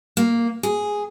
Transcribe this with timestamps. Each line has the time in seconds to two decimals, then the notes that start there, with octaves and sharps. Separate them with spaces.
0.17 A#3
0.63 G#4